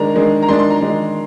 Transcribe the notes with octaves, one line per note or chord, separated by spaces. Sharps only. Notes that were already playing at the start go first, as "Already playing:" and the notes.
Already playing: D#3 G#3 D4 A#5
D#3 G#3 D4
A#5
D#3 G#3 D4 C6
C6
A#5
D#3 G#3 D4